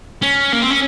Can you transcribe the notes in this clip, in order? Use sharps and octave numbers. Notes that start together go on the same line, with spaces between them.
C#4
A#3
C4
C#4